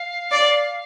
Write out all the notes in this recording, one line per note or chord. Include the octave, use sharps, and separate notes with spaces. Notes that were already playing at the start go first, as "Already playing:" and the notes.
Already playing: F5
D5